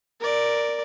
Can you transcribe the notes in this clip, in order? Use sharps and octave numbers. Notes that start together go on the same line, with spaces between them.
A#4 D5